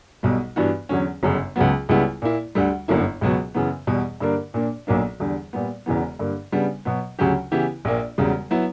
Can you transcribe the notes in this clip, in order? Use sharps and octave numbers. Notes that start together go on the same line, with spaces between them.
B1 B2 G3
G2 E3 B3 D4 F#4
E2 D3 F#3 C#4
G1 F#2 C#3
C#2 C#3 F#3 B3
C#2 C#3 G3 B3 E4
A#2 A#3 E4
D2 D3 G3
G1 F#2 D3 A#3 E4
C#2 B2 F#3 B3 F#4
F#2 C#3 E3 B3
E2 B2 G3
G2 D3 A#3 D4 A#4
A#2 A#3 D4
B1 A#2 F#3 A#3 D4
E2 D3 G3
A#2 G3 B3
E1 E2 C#3 E3 B3
G2 D3 A#3
C#3 G3 B3 D4
B2 F#3 B3
D2 C#3 F#3 C#4 G4
C#3 E3 B3 E4 G4
A#1 A#2 A#3
E1 E2 C#3 G3
F#3 B3 E4